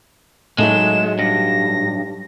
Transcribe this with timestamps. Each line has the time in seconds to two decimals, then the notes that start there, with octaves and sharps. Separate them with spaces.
0.58 A2 F#3 G#3 A3 D#4 E7
1.19 G2 A#6